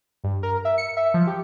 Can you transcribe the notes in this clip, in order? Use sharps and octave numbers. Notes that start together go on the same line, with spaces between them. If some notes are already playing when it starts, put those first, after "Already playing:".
G2
A#4
E5
C#7
E5
F3
G4